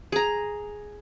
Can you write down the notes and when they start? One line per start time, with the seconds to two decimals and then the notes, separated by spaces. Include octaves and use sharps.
0.12 G#4 A#5